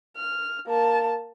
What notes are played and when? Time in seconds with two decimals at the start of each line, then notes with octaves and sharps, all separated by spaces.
0.17 F6
0.67 A#3 A5